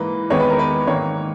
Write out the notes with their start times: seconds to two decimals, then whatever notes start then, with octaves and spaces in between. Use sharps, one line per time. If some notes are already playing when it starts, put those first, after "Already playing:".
Already playing: G#2 E3 A#3 B4
0.30 E2 D#3 G#3 B3 C#5
0.39 B4
0.50 A#4
0.59 B4
0.87 G#2 D#3 A#3 C#5